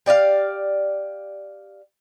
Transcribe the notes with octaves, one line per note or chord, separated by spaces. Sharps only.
G4 D5 D#5 F5